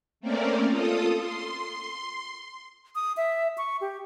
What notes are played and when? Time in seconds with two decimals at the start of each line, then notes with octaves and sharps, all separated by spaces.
0.21 A3 A#3 C4 C#4 A#4 D5
0.70 F4 A4 D#6
1.20 C6
2.95 D#6
3.17 E5
3.58 C#6
3.81 G4